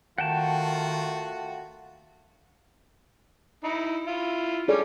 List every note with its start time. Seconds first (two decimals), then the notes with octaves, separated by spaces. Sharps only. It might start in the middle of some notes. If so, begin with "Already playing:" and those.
0.18 D#3 A3 F4 F#4 F#5 G5 A5
3.64 D#4 E4
4.07 E4 F4
4.68 G3 C#4 G#4 A4 D5